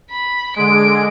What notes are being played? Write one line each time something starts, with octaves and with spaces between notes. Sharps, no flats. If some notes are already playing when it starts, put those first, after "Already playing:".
B5
D3 G#3 D7